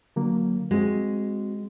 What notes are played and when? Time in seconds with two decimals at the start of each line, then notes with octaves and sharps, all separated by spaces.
0.16 D3 F#3 A#3
0.71 G#3 C4 F#4